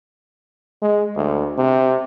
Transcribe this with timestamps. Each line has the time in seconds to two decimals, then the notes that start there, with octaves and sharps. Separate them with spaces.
0.82 G#3
1.16 D2
1.58 C3